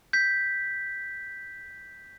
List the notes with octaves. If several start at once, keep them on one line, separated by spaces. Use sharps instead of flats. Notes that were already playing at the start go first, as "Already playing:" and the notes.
G6 B6